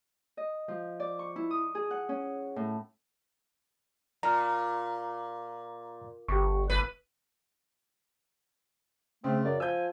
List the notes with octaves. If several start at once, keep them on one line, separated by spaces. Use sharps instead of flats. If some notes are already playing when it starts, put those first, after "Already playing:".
D#5
F3
D5
C#6
E4
D#6
G#4
F#5
C#4
A2
A#2 A#5 F6
G1 G4 C#6
G1 B4
C#3 A3 C4
F#2 D5
F3 G#5 E6 G6